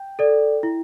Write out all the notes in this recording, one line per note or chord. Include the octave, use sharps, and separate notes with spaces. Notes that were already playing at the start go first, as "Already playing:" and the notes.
Already playing: G5
A4 D5
E4